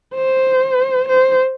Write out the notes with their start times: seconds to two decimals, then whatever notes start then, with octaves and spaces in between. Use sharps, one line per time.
0.15 C5
1.09 C5